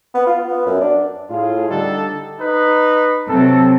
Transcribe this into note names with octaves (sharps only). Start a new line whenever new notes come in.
B3
F4
B3
F#2
D4
A2 F4 G#4
D3 G3 D4 D#4 G4 A4
D#4 B4
C3 F#3 A4